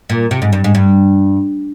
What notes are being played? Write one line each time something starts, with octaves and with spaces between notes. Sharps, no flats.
A#2
C3
G#2
G2
G#2
G2